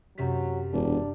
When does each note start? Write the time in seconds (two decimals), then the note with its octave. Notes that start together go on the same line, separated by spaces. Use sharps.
0.18 F#2 C3 F#3 B6
0.73 E1 D4